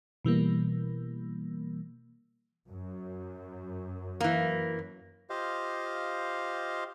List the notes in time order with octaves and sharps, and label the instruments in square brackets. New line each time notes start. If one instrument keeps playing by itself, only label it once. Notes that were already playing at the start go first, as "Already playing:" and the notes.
[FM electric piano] B2 E3 G3 A#3
[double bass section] F#2
[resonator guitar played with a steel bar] E3 A#3
[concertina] F4 G4 C5 D#5 F5